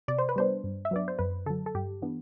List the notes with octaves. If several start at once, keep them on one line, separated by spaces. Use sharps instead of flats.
C3 D5
C5
B4
G3 B3 D4 C5
G2
E5
F#3 B3 D4 D5
C5
F#2 B4
D3 F#3 A4
A4
G2 G4
E3 B3 D4